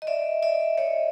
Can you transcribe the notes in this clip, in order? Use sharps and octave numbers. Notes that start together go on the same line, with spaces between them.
D#5
D5 E5
D5 E5
C#5 D#5